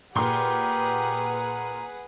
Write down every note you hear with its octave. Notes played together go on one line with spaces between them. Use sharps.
A#2 G4 G#4 B4 F#5 A#5 C6